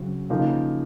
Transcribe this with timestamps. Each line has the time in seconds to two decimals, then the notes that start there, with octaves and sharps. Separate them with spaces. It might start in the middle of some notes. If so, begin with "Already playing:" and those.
Already playing: C#3 F#3 C4
0.30 C#3 F3 A#3 D#4